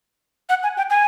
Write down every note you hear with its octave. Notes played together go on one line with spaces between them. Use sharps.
F#5
G#5
G5
G#5